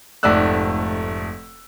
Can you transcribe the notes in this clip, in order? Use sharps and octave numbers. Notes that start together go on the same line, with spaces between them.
F1 G#2 A3 D5 E6 F#6